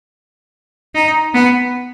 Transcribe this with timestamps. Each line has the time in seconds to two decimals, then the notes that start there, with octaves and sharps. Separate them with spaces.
0.95 D#4
1.34 B3